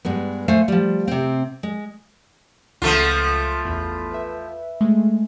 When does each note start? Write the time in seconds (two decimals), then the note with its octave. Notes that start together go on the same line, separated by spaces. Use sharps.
0.05 G2 G#3 B3
0.48 A3 C5 F5 G#5
0.68 F3 G3
1.08 C3 C4
1.63 G#3
2.82 C#2 F3 A3 F4 F#5
3.65 A1 E2 B5
4.11 B4 E5
4.81 G#3 A3